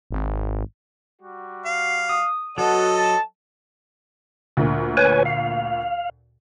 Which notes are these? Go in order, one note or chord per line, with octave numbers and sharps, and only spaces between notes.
G#1
G3 F#4
F5
D#6
F#3 B3 F#4 A4 D#5 F#5 A5
A5
D2 A#2
B4 C#5 G#5
F5